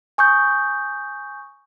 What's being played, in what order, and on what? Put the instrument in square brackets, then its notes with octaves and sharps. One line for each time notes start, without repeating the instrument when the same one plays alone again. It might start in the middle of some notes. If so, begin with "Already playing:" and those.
[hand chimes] G#5 C#6 D#6 G6